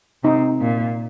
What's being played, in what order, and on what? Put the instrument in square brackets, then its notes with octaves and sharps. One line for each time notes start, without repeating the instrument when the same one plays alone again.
[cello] C3 [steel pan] D#4
[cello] A#2